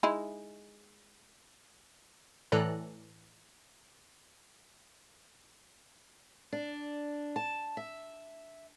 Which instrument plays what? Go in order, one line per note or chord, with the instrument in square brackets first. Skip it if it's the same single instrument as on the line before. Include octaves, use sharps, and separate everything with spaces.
[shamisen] G#3 D#4 E4
[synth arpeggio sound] A2 E3 A4 D5 A#5 F#6
[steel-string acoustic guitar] D4
A5
E5